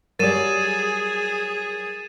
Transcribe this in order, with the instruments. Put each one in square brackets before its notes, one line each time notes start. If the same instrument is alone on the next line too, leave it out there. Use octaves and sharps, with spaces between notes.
[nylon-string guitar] F#3 G3 D5 [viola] G#4 [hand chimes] A#4 [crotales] A6 D#7 E7